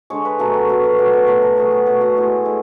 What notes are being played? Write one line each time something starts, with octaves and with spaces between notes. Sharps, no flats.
D3 G#3 C#5
B4
B2 F#3 A3 A4
C#5
B2 F#3 A3 B4
C#5
B2 A3 D5
C#5
B2 A3 B4
A4
B2 F#3 A3 G#4
G#4
B2 F#3 A3 F#4
F#4
A2 G#3
A2 G#3